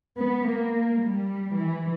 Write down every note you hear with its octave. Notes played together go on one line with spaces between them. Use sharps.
B3
A#3
G3
E3